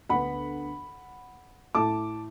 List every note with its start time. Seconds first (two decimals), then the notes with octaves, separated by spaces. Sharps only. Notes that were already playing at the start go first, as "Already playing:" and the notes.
0.09 D2 D3 B3 F#5 B5
1.75 A2 A3 A5 D6